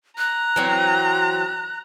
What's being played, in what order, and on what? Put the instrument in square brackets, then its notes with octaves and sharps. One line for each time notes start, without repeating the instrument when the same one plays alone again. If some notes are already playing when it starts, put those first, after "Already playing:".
[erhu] A#5 [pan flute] F#6
[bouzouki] E3 F#3 C4